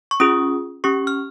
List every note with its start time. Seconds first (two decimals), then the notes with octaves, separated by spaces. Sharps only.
0.11 C#6
0.20 C#4 F4 G#4 D#6
0.84 C#4 G4 C#6
1.07 F6